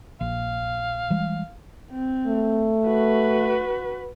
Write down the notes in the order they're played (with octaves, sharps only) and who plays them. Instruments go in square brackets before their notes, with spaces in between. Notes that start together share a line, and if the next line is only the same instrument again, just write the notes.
[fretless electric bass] A#1 [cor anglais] F5
[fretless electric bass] E3 G3 G#3
[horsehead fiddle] C4
[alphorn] A3
[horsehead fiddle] F#4 B4